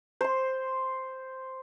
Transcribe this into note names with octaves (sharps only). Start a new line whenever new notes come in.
C5 C6